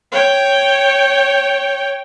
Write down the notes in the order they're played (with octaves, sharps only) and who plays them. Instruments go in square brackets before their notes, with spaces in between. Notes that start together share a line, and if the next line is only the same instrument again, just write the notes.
[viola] C#5 G5